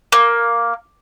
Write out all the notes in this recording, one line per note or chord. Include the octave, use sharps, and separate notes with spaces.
A#3